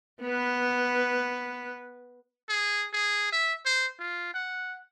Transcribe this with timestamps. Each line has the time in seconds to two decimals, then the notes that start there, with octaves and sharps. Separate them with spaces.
0.23 B3 B4
2.49 G#4
2.93 G#4
3.32 E5
3.66 C5
3.99 F4
4.34 F#5